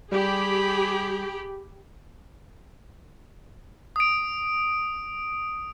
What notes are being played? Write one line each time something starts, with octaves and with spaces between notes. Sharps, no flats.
G3 G4 G#4 B5
D#6 D7